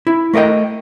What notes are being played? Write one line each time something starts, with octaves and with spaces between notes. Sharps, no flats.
E4
A3 A#4 D5 D#5 G5